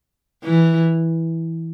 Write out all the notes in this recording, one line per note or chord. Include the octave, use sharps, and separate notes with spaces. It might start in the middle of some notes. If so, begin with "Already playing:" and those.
E3